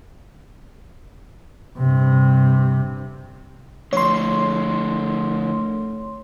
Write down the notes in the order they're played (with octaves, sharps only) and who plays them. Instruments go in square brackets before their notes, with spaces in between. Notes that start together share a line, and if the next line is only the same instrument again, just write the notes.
[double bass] G2 C3
[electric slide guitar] D3 F3 [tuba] A3 [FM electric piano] C#5 C6